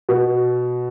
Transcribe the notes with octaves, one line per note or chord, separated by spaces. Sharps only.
B2